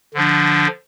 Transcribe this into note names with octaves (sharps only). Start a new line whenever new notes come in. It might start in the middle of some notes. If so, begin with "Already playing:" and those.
D3 F3 D4